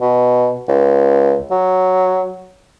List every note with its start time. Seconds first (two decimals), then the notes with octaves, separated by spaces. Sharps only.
0.01 B2
0.68 C#2
1.51 F#3